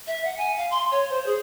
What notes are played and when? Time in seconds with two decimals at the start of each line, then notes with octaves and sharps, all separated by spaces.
0.07 E5
0.25 F#5
0.38 G#5
0.57 F5
0.71 C6
0.92 C#5
1.10 C5
1.26 G#4